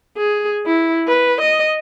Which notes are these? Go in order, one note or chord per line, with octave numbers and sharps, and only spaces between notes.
G#4
E4
B4
D#5